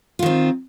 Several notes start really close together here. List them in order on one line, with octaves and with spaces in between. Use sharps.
F4 D#3 C4